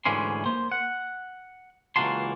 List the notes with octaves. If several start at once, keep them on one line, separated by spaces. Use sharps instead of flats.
D2 G#2 D3 E3 C#4 C6
A#3 C5
F#5
C#2 E3 A#3 F#4 A5 C6